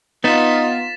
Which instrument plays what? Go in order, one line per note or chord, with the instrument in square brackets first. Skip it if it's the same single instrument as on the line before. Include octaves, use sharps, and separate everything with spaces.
[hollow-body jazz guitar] B3 [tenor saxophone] D#4 [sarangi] F4 [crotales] A6 B6 E7